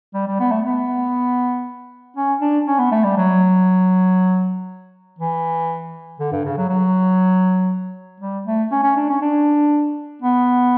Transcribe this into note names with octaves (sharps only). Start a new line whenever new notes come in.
G3
G3
B3
A3
B3
C#4
D4
C#4
B3
A3
G3
F#3
E3
D3
G2
C#3
F#3
F#3
G3
A3
C#4
C#4
D4
C#4
D4
B3